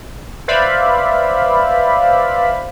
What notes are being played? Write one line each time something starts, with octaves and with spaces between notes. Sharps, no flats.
B4 C5 D5 E5 F5 B5